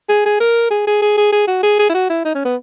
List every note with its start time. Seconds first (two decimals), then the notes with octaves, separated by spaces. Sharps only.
0.09 G#4
0.26 G#4
0.41 A#4
0.71 G#4
0.87 G#4
1.02 G#4
1.17 G#4
1.33 G#4
1.48 F#4
1.63 G#4
1.79 G#4
1.89 E4
1.95 F#4
2.10 E4
2.25 D#4
2.35 C#4
2.45 B3